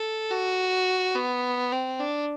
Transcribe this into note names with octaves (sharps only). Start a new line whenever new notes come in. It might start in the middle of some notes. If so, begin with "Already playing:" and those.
Already playing: A4
F#4
B3
C4
D4